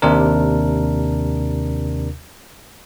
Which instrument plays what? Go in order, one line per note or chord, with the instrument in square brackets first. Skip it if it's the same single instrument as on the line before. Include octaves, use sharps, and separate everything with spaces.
[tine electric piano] D#2 C3 D4 A#4